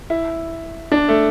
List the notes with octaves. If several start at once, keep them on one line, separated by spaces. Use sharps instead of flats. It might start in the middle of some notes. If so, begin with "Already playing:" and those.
E4
D4
A3